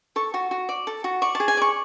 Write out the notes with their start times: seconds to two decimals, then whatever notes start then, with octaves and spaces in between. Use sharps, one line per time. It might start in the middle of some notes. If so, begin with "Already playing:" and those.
0.16 A4 C#6
0.34 F#4
0.51 F#4
0.69 D5
0.87 A4
1.04 F#4
1.22 D5 C#6
1.35 A5
1.40 G#4
1.48 G#5
1.57 D5 C#6